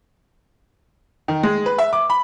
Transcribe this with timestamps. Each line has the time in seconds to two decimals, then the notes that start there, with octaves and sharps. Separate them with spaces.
1.28 D#3
1.43 G#3
1.66 B4
1.78 E5
1.93 D6
2.10 B5